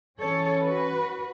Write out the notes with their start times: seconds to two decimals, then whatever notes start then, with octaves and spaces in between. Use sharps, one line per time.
0.20 E3 C#4 A4 C#5
0.63 F#4 B4